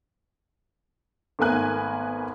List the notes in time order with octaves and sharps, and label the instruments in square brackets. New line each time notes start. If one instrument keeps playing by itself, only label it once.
[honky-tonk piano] G#1 A3 B3 A#4 G#5 F#6